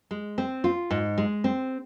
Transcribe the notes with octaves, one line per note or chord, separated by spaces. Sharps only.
G#3
C4
F4
G#2
G#3
C4